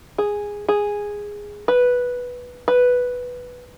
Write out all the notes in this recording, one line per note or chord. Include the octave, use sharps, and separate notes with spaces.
G#4
G#4
B4
B4